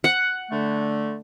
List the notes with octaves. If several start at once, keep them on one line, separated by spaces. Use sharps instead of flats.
F#5
D3 A3